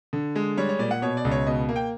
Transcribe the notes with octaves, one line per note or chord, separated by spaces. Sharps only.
D3
G#3
G3 C#5
C#5
A#2 D5
F#5
B2 C#5
D5
C#2
C#5
B2 D#5
A#3
G5